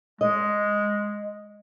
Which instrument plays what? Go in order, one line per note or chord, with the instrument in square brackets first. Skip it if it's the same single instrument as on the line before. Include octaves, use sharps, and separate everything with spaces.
[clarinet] G#3 [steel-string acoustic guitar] D#5